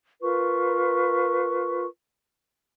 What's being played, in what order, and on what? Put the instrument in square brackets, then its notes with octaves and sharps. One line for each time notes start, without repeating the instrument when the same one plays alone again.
[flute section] F4 A#4 B4 C#6